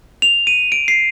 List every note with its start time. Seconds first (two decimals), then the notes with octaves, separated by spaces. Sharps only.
0.22 F7
0.47 D#7
0.72 D7
0.88 C7